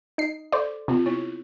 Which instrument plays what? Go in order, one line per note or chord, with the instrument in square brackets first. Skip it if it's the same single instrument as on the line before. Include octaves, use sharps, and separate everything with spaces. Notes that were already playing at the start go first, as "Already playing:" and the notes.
[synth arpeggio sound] D#4 C7
[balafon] A4 [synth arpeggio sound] C5 D5
[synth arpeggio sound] C3 [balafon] B3 C4 F4
[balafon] B3 E4 C#5